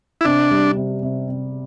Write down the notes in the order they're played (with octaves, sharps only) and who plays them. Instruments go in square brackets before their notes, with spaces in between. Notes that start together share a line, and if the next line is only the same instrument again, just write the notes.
[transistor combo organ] E4
[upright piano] C3 [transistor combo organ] D4
[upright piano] G3
C3
C3
C3